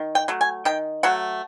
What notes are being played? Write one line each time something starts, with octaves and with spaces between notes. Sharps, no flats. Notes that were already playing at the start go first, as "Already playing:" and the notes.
Already playing: D#3
G5
F#3 A3
G#5
D#3 G5
F#3 A3 F#5